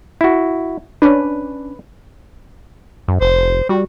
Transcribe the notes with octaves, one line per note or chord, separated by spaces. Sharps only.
E4 F#4
C#4 D4 B4
F#2
F1 C5
G3 F#4